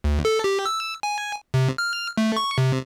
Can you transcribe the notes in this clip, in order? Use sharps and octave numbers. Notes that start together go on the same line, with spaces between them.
D2
A4
G4
E6
G#5
C3
F6
A3
C#6
C3